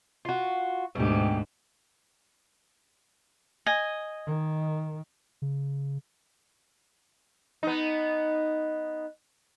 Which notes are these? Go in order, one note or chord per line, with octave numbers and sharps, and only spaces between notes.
F4 F#4
D2 G#2 B2 G4
D#5 G#5
D#3
C#3
B3 D#4